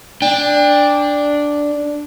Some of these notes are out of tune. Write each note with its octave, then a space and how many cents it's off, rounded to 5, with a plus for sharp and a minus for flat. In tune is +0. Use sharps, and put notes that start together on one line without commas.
D4 +0 G5 +30